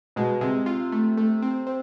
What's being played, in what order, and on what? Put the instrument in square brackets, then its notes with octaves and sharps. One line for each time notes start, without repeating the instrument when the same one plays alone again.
[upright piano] B2 [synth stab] G#3
[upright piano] C3 [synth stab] G#3
[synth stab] F4
A3
A3
C4
C4